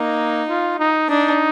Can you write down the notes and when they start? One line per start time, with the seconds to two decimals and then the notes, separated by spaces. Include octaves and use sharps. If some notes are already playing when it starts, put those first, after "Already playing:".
Already playing: A#3 D#4
0.49 F4
0.80 D#4
1.09 D4 D#4